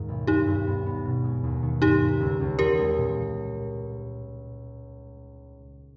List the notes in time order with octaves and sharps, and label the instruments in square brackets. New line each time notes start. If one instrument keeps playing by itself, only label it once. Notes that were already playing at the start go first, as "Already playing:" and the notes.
Already playing: [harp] D#2 G#2 D#3
B1
[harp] G2 [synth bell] D#4 G4
[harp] G2
B3
B3
B2
G#3
D#2
D#3
[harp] G2 [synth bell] D#4 G4
[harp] A#3
C#2
C#2
[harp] E2 [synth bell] G4 A#4
[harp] G#3
A#2